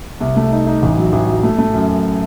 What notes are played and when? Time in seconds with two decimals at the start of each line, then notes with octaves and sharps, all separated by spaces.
0.20 C2
0.36 A3
0.52 D#4
0.67 D#4
0.82 A1
0.97 F#3
1.12 A1
1.27 F#3
1.43 A3
1.58 A3
1.74 F#2
1.89 F#2